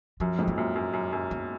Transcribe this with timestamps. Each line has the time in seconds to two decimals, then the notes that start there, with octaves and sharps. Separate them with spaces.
0.20 F#2 F3
0.39 F2 G#2
0.48 A#3
0.57 F#2 A#2
0.76 F#2
0.93 F#2
1.13 F#2
1.31 B3